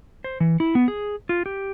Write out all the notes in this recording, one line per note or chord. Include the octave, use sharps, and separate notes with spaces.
C5
E3
E4
B3
G#4
F4
G4